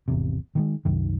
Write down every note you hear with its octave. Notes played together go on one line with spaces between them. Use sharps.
G#1 E2 C3
D#3 G3 G#3
C2 F#2 D#3